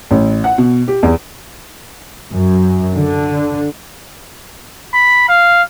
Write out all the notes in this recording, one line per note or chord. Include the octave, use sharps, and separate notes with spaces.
A1
F#5
B2
G4
E2
F#2
D3
B5
F5